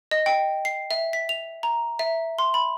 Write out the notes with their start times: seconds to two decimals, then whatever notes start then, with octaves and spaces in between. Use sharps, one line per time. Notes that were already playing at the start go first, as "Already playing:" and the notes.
0.11 D#5
0.26 G5
0.65 C7
0.91 E5
1.13 B6
1.29 F7
1.63 A#5
1.99 E5
2.39 C6
2.54 B5